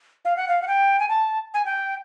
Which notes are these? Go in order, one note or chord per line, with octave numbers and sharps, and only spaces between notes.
F5
F#5
F5
F#5
G5
G#5
A5
G#5
G5